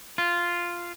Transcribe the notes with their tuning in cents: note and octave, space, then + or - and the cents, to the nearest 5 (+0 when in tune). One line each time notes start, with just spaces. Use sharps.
F4 -5